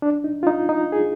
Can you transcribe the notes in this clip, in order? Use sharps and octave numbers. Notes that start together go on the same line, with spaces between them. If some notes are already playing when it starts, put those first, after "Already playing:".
D4
D#4
F4
D#4
D#4
G#4